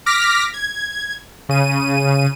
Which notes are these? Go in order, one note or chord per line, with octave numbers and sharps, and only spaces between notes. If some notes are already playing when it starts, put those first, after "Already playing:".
D6 F6 A#6 B6
G#6
C#3 D#7